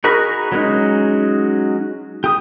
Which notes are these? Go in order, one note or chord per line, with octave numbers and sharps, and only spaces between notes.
D#4 F#4 G#4 A#4 B5
F#3 G#3 C#4 D#4
G4 D#6